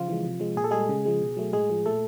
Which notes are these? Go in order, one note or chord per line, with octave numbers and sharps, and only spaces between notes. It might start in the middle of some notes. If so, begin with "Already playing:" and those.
Already playing: C#3 F3 F4
E3 G#3
C3
F3 G#3
A#2 G#4
A4
G3 G#3 G#4
C#3
F3 G#3
B2
F#3 A3
A2 G#3 G#4
F3 G#3
A#2 A3 A4